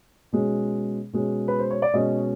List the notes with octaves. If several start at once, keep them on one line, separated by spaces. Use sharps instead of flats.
B2 G#3 C#4
B2 G#3 C#4
B4
C5
C#5
D5
B2 G#3 C#4 D#5